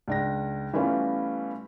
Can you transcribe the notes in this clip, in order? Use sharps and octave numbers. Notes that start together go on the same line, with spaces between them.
C#2 D4 A#6
E3 G3 A3 B3 C#4 F4